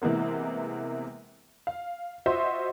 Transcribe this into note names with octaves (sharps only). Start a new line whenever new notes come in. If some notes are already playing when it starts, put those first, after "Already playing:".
C3 E3 G#3 A#3 B3
F5
F4 F#4 C5 D#5 E5 C6